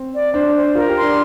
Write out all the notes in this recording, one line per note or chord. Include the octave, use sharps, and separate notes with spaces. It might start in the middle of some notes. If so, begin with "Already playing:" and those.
Already playing: C4
D5
D4 C5
C5
F4 A#4
G4
C6
D4